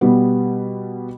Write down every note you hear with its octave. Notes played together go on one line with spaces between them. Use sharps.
B2 G3 B3